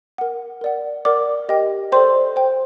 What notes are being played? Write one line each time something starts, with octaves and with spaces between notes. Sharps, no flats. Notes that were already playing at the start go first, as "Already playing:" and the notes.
A#4 F#5
A#4 D5 F#5
A#4 D5 F#5 D6
G4 A#4 D#5 G5
A4 C5 D5 G5 C6
C5 G5